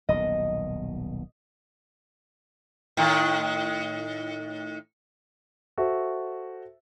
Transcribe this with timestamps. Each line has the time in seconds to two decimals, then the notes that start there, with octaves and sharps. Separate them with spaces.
0.09 D#1 B1 B2 D#5
2.97 A2 D#3
5.78 F#4 A4 C5 E5